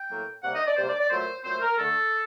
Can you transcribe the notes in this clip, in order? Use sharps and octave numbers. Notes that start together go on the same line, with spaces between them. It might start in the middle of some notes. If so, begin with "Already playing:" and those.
Already playing: G5
A2 F#3 A#3
C3 G3 A#3 F#5
D#5
D5
C3 G3 A#3 C5
D5
D5
A#2 F#3 A3 C5
A#2 F#3 A3 C5
A#4
D3 A3 A4